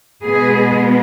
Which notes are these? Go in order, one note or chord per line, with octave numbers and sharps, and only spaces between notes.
B2 G#3 B3 G#4